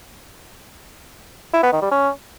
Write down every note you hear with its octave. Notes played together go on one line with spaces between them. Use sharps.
E4
B3
D#3
G3
C#4